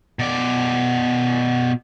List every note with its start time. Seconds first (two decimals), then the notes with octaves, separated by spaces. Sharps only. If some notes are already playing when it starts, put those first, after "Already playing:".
0.19 B2 D5